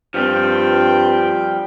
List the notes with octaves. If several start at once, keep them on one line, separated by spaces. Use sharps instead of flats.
G2 F3 G3 C4 F4 G5